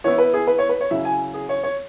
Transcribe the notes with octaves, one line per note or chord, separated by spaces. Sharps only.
E3 B3 E4 C#5
B4
G#4
B4
C#5
B4
C#5
C#3 F#3 E4 E5
G#5
G#4
C#5
C#5